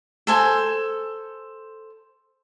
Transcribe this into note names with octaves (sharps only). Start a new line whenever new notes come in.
A4 C5 G#5